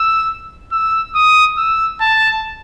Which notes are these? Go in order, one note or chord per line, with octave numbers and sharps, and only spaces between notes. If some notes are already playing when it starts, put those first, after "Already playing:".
Already playing: E6
E6
D#6
E6
A5